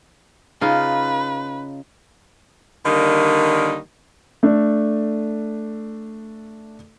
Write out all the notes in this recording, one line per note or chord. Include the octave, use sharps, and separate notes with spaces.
C#3 D#4 F4 B4
D3 D#3 G3 A#3 D#4
A3 D4 A4